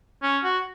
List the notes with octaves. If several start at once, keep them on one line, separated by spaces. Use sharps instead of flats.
C#4
F#4